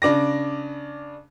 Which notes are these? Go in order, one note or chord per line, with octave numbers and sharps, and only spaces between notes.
C#3 D4 D6 A#6